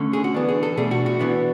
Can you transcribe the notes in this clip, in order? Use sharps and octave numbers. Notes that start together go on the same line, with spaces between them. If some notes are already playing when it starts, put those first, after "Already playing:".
Already playing: D3 A3 C#4
G#4
F#4
E3 B3 D4
G#4
A4
B2 A3 D4 G#4
F#4
F#4
E3 B3 D4